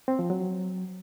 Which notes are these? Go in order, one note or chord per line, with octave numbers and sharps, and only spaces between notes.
C4
F3
F#3